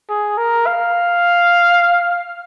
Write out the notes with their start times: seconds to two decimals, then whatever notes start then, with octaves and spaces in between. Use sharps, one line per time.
0.09 G#4
0.38 A#4
0.67 F5